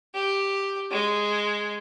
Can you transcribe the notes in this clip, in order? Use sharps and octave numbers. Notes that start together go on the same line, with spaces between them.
G4
G#3